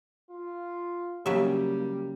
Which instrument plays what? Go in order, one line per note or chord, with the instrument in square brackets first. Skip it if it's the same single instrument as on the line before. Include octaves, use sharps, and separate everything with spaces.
[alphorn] F4
[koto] C#3 F#3 E5 [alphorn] G3 [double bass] A#3 [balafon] G4